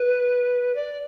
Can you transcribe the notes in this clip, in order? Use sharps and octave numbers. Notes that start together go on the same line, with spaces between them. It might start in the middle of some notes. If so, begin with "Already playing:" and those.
Already playing: B4
D5